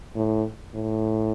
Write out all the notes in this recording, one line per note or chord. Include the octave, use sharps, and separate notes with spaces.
A2
A2